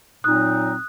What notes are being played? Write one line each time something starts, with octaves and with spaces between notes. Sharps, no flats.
A#2 F#3 C4 D#4 D#6 F#6